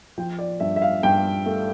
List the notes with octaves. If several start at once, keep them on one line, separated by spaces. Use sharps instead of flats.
F3 G5
D5
G2 E5
E5
F5
G2 G5
A3